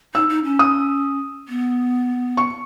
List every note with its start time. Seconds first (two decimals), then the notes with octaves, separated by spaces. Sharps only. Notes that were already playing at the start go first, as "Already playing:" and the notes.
0.14 D#4 E6
0.29 D#4
0.44 C#4
0.59 D#6
1.48 B3
2.37 C#6